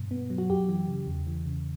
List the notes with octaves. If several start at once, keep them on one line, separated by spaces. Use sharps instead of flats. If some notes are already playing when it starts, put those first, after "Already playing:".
Already playing: G2 B2
B3
F#3
F#4
F#2 G4
E3
C#3
E2
E3
C#3